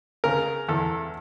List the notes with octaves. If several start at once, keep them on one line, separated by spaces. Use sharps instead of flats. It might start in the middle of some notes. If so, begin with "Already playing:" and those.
C#3 A#4
E2 A4